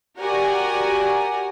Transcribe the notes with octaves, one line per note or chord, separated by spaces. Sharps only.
F#4 G4 A#4 D5 F#5 G#5